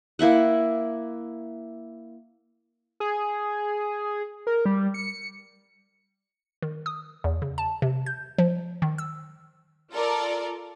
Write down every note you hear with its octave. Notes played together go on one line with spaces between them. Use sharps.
A#3 E4 E5 F#5
G#4
A#4
G3
C#7
D#3
D#6
E2
C#3
A5
C3
G6
F3
D#3
E6
F4 A4 A#4 D5